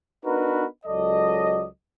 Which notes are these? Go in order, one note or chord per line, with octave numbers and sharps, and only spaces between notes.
B3 D4 D#4 F#4 A#4 B4
C#2 F#3 A4 D5 D#5